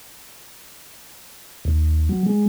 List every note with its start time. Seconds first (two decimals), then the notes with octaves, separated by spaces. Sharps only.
1.65 D#2
2.09 F#3
2.26 G#3